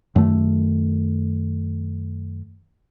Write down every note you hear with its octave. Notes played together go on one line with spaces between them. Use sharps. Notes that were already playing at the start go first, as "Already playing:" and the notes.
F#2 D#3 A3